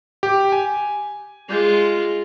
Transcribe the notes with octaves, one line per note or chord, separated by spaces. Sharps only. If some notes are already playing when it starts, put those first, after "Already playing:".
G4
G#5
G#3 F4